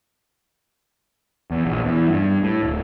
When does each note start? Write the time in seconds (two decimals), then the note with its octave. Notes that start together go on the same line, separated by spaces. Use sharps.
1.51 E2
1.65 A#1
1.84 E2
2.08 G2
2.43 A2
2.63 D1